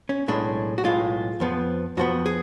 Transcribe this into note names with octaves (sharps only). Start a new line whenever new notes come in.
C#4
B1 A2 G#3 D4
F#4
B1 A2 G#3 F4
F2 F3 B3
F2 F3 B3 F#4
G#4